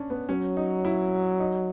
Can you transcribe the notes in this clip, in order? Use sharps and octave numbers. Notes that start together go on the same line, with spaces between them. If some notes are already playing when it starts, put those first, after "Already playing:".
Already playing: C#4 D4
B3
F#3 C#4
D#4
E4
D#4